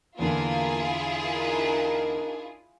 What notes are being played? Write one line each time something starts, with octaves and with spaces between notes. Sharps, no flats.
E2 D3 A#3 E4 F4 G#4
D4 D#4 A#4